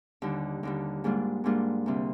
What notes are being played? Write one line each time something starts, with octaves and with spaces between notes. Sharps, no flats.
D#2 D3 G3
D#2 D3 G3
G#2 G3 A#3 D4 F4
G#2 G3 A#3 D4 F4
D2 C3 G3